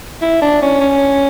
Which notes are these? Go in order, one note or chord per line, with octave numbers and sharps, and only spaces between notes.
E4
D4
C#4
C#4